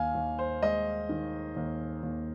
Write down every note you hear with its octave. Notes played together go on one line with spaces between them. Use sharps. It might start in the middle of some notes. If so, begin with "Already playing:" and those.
Already playing: D#2 F5 G#5
D#2
C5
G#3 D#5
D#3
D#2
D#2